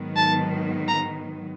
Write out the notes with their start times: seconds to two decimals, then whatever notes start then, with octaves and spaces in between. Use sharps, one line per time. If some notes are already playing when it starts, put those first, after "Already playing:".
Already playing: G#2 D#3 F#3 B3
0.16 A5
0.88 A#5